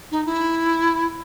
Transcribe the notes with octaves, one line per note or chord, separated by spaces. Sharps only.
D#4
E4